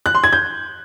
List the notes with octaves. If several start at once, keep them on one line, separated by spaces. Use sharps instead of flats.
F#6
C6
G#6
G6